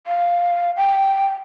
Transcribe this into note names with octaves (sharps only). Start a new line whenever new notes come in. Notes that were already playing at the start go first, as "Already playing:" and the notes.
F5
G5